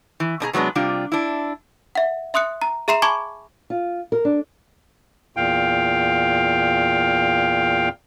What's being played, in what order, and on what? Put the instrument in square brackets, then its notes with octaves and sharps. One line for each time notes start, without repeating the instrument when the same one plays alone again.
[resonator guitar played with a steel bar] E3
B2 D4 G#4 A#5
C3 F#3 G#3 B3 D4
C3 G3 D4 F4
D4 E4
[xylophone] E5 F#5
E5 C6 D#6 F#6 C#7
A#5
G#4 E5 A#5 C6 C7 E7
G#5 A5 B5 C#6 D6 G#6
[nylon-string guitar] F4
A#4
D4
[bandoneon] E2 A#2 F5 G5